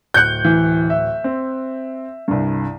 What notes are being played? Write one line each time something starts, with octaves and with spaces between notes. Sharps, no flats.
D1 F#6 G6 C#7
E3
E5
C4
C2 G2